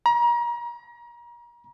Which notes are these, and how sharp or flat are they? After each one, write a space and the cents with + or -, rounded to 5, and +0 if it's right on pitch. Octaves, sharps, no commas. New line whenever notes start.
A#5 +35